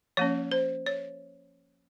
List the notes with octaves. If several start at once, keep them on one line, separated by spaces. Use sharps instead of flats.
F3 A#3 C#4 C#5
C5
C#5